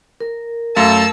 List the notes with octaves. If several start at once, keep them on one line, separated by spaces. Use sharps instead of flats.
A#4
F#2 A3 F5 A5 E6